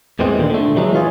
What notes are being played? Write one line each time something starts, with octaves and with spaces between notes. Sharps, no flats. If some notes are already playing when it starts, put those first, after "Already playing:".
E2 A2 E3 G#3 C4
D#2 A#2 D3
D3 A3
E3 F#3 G#3 A3
E3 C#4 F4 G#4